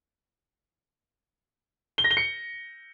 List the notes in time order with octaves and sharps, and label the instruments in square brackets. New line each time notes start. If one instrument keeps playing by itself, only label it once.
[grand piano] G7
A#6
G7
C#7